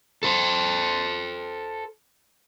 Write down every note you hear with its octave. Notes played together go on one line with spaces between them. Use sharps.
A4 C5